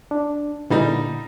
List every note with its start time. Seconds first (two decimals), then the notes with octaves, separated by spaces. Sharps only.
0.11 D4
0.70 A#2 D3 E3 G3 D#4